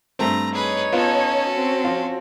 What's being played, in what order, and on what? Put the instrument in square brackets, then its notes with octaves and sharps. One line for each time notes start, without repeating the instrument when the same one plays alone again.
[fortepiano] G2 A3 C4 [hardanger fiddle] A#5
[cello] D#4 C#5 [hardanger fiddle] G#4 B4
[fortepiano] B3 F4 [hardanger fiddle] C#4 A4
[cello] C4 F#4
[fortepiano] F3 F4